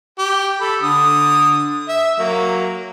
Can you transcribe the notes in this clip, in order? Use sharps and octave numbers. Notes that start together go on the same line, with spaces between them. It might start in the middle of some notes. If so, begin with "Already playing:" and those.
G4
A4 B5
D3 D#6
E5
F#3 A#3